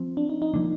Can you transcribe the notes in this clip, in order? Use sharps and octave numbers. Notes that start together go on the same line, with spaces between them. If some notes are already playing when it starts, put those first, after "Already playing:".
Already playing: F3 C4
D4
D#4
D#4
F3 A#3 D4